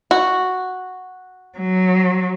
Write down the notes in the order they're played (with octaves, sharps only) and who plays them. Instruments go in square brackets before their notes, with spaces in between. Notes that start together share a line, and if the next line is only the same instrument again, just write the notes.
[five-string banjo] F#4
[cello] F#3